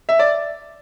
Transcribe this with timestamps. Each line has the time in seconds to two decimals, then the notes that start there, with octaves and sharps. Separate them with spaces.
0.09 E5
0.19 D5